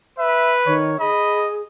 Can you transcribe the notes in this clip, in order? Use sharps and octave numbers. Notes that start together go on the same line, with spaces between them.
B4 E5
D#3 C#5
G#4 D#5 B5